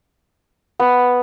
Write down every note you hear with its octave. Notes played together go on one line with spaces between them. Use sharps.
B3